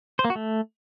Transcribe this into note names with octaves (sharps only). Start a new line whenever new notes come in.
C5
A#3
F#4
A3